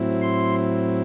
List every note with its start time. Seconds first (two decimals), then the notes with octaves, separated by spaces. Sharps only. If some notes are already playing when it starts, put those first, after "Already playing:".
Already playing: A2 F#3 C4 E4
0.22 C6